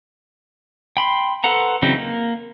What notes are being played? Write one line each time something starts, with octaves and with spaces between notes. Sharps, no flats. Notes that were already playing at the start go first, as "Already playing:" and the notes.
G5 B5 C6
A4 B4 C5 F#5 A#5
C#3 E3 F#3 C4 D#4
A#3